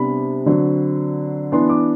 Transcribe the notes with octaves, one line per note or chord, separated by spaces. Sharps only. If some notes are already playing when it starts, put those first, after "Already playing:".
Already playing: C3 G3 B3 D4 B5
D3 F#3 C4
E3 B3 D4 C6
D6